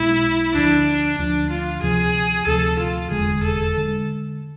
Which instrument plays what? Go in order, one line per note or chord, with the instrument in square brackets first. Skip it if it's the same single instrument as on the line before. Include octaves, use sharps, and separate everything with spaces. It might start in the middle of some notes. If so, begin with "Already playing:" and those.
Already playing: [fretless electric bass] B1 B2 G#3 [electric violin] E4
[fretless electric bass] D2 D3 F3 [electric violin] D4
[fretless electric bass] D2 D3 F3 [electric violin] D4
[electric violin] F4
[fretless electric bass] D2 C3 F3 [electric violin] G#4
[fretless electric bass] D2 C3 F3 [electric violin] A4
[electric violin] F4
[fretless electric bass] F1 E2 D3 G#3 [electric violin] G#4
[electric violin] A4
[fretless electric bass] D3 G#3